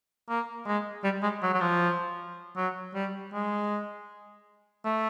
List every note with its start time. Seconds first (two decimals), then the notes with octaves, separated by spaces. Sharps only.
0.29 A#3
0.66 G#3
1.04 G3
1.23 G#3
1.43 F#3
1.54 F#3
1.61 F3
2.56 F#3
2.94 G3
3.33 G#3
4.85 A3